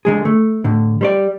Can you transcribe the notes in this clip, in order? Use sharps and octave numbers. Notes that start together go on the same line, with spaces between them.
D3 G#3 G#4
A3
A2 D3
G3 C5 D5